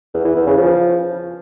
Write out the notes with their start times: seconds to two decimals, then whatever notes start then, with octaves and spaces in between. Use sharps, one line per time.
0.14 E2
0.25 E3
0.36 E2
0.46 C#3
0.57 F3